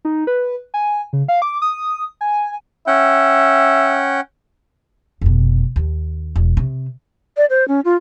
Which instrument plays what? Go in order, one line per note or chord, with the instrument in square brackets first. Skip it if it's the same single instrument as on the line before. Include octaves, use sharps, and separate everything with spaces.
[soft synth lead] D#4
B4
G#5
C#3
F5
D6
D#6
G#5
[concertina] C#4 F#5 G5 [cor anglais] E5
[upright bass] F1 B2
D#2
E1
C3
[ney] D5
C5
C#4
F4